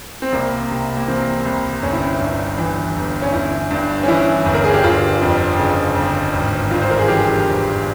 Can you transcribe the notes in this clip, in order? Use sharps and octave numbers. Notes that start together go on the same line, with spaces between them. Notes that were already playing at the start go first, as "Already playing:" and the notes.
C4
C2 A#3
C3
A#3
E3 C4
C2
G1 C#4
E4
C#4
G2
E3
G1
C#4
G1 E4
G2
C#4
E3 E4
G1
A#4
G#4
G4
G1 F4
F2
C#3
G1
G#1
G2 F4
C5
A#4
G#4
E3 G4
G#1